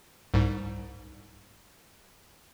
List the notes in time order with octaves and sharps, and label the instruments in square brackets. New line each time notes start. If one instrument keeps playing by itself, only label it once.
[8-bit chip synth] C2 G#2